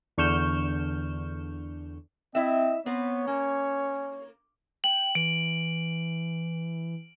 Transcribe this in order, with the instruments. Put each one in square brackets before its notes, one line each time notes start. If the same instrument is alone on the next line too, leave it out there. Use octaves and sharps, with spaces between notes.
[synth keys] E2 D3 C#6 F6 G6 E7
[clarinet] C4 [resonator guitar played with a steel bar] E4 E5 [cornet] D#5
[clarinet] B3 [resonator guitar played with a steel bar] C4 B4 [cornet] C#5
[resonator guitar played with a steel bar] A#3 [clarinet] C#4
[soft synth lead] G5 [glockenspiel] F#7
[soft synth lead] E3 [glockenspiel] D7